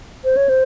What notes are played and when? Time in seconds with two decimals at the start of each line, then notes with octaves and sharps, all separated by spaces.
0.24 C5
0.37 C#5
0.49 C5